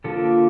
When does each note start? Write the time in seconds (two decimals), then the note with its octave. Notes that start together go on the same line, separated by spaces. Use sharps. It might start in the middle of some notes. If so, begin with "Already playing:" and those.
0.04 D3 F3 A#3 A4